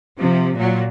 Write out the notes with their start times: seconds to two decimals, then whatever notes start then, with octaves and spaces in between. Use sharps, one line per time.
0.18 C3 F3
0.55 A#2 F#3